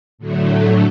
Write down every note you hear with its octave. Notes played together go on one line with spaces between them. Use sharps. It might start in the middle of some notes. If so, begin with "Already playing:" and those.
A2 D3 F#3 A3